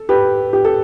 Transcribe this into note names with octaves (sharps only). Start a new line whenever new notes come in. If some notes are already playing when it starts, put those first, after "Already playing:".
Already playing: A4
G4 B4
G4
A4